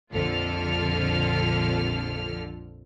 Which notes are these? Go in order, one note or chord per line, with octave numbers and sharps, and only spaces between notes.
A#1 F2 D3 F4 A4 F6